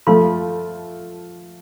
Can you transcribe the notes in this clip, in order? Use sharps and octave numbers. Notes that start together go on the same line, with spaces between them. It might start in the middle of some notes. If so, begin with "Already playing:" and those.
F3 A3 F4 A4 F5 C6